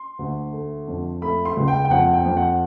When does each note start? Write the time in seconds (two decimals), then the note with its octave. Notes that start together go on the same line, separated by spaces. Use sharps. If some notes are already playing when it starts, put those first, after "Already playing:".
Already playing: C6
0.19 D2
0.53 A3
0.88 F2
1.22 A3 B5
1.45 C6
1.57 C#2
1.68 G5
1.85 G5
1.91 F2 F#5
2.13 G5
2.26 F2
2.37 F#5